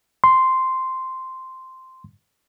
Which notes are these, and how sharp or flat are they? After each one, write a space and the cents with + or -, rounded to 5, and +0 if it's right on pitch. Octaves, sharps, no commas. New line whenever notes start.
C6 -5